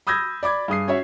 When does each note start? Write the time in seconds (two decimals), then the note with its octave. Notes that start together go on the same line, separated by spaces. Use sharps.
0.07 B5 D#6 E6 G6 G#6 A#6
0.43 D5 B5 D6 G#6
0.68 G2 G#4 D#6 C7
0.88 C#4 F#4 C#5 E5